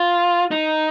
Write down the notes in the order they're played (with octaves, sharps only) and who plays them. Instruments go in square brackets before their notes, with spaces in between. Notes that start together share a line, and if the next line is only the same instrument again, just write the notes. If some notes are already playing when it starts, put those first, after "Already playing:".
Already playing: [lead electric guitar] F4
D#4